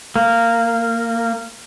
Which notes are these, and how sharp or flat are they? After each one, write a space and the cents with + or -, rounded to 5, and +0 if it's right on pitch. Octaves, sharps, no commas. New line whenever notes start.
A#3 -15